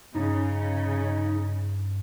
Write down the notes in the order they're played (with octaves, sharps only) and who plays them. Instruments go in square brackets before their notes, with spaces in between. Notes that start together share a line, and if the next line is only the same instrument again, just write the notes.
[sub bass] G2 [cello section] C#3 [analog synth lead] D#4